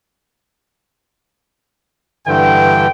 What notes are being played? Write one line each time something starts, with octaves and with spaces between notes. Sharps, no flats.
G2 D3 E3 G5